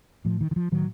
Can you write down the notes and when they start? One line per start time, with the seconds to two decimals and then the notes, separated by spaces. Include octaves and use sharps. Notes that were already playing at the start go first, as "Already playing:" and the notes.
0.25 A2 F3
0.41 D#3
0.51 D#3
0.56 F3
0.71 A2 D#3 F#3